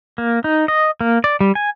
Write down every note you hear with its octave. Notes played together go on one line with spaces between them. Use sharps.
A#3
D#4
D#5
A#3
D5
G3
G#5